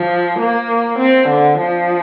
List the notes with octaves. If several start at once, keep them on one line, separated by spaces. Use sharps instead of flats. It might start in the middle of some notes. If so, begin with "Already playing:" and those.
Already playing: F3
A#3
C4
D3
F3